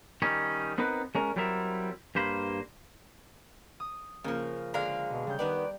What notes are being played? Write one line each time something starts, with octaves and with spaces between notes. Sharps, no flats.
D#3 G3 C#4
B3 C4 D#4 A#4 B4
G#3 C#4 A#4
F#3 G3 C4 E4 A#4 E5
G2 A#3 C5 B5
D#6
C#3 F3 A#3 A#4
D3 G#3 F5 A#5
B2
C#3 G3 G6
D#3 B3 G4 B4 D5